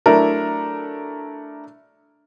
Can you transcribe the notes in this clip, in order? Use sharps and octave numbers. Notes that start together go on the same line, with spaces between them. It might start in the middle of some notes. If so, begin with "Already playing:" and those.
F#3 A3 D4 E4 A#4